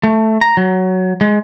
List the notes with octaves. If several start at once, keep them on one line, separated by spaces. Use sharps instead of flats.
A3
A#5
F#3
G#3